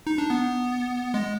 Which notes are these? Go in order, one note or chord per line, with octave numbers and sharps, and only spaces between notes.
D#4
D4
B3
G#3